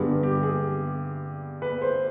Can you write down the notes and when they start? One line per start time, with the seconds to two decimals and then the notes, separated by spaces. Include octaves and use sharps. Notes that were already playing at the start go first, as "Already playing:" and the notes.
Already playing: G2 D3 G3 B3 G#4
0.23 G4
0.43 G#4
1.62 B4
1.81 C5